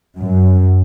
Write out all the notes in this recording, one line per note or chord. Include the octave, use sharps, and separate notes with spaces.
F#2